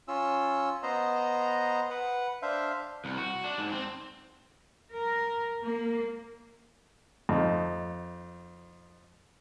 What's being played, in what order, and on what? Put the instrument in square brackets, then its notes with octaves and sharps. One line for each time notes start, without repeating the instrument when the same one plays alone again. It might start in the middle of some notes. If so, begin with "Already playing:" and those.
[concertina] C#4 F4 E6
B3 C5 D#5 A#5
B4 F#5
D4 C5 E5 F5
[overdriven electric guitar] C2
F#4
D4
G#2
C4
[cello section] A#4
A#3
[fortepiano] F2 D#4